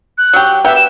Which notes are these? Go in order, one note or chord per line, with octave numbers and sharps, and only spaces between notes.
F#6
F#3 G4
B3 G4 E5
E7